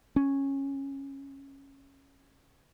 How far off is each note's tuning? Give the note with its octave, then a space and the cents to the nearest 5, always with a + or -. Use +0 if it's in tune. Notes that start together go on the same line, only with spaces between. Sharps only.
C#4 -10